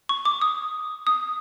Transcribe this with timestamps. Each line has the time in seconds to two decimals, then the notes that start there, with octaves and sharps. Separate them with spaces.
0.09 C#6
0.25 D6
0.41 D#6
1.07 D#6